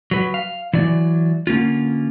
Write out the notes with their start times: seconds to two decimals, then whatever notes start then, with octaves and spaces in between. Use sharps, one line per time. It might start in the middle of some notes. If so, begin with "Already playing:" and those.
0.11 F#3 B4
0.34 F5
0.73 E3 F#3 D5
1.47 D3 A#3 C#4 F4